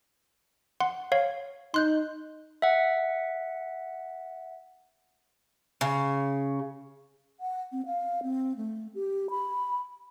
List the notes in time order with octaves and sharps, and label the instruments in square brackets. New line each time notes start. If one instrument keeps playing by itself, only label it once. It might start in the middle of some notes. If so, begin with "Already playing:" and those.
[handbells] F#5 C6
C#5 F5
[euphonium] D#4 [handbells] C6 F#6 G6
[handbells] E5 F#5
[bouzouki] C#3
[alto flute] F#5
C4
F5
C4
A3
G4
B5